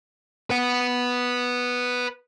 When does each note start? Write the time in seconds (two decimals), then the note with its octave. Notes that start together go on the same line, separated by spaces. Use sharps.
0.50 B4 F#5